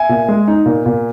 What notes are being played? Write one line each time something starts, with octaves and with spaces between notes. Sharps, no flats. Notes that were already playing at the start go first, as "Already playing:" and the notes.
Already playing: E5 G#5
A#2
G#3
D#4
A#2
A#2